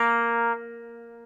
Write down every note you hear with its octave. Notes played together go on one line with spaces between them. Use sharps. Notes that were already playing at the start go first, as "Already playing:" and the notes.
Already playing: A#3